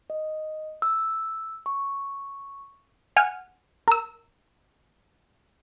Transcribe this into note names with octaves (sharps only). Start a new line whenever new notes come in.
D#5
E6
C#6
F#5 G#5 F6
A#4 E6